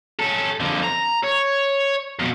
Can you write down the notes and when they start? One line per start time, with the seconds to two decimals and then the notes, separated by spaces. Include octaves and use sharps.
0.19 C#4 A4
0.60 F2 D3
0.83 A#5
1.24 C#5
2.19 F2 B2